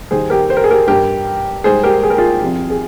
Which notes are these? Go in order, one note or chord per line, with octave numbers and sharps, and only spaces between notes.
D#2 D#3 G3 G#4 C5
G4 A#4
C5
A#4
G#4
G4 A#4
G2 G3 G4 A#4
G#2 G3 G#4 C5
G4 A#4
G#4
A#4
F4 G#4
C2 C3 F3
G#4